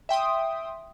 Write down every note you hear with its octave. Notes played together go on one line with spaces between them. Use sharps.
E5 G5 C6 D#6